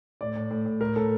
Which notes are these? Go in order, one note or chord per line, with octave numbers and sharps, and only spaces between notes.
A2 D5
A2
A2
A2
A2 A#4
A2 A4